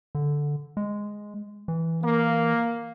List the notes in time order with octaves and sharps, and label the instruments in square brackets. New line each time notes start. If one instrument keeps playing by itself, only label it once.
[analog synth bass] D3
G#3
E3
[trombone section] A#3